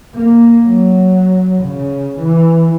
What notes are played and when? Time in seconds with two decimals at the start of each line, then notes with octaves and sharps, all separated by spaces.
0.15 A#3
0.67 F#3
1.63 C#3
2.19 E3